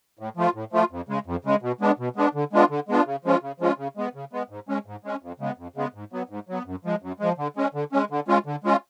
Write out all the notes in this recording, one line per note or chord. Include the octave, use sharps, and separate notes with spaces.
A2
F3 A3 F4
A2
F3 A3 F4
F2
C#3 G#3
F2
C#3 G#3
B2
G#3 B3 D4
B2
G#3 B3 D4
D3
G#3 B3 D4 F4
D3
G#3 B3 D4 F4
C#3
F3 G#3 C#4 F4
C#3
F3 G#3 C#4 F4
C#3
G#3 B3
C#3
G#3 B3
G#2
G#3 C#4
G#2
G#3 C#4
F2
C#3 G#3 B3
F2
C#3 G#3 B3
G#2
F#3 B3
G#2
F#3 B3
F#2
F3 G#3
F#2
F3 G#3
D3
G#3 C#4
D3
G#3 C#4
D3
G#3 C#4 F4
D3
G#3 C#4 F4